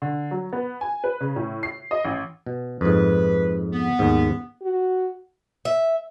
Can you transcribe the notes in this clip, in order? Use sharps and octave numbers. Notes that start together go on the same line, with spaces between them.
D3
F#3
B3
G#5
B4
C#3
A2
C7
D#5
A1
B2
F2 G#2 B4
B3
D#2 G#2
F#4
E5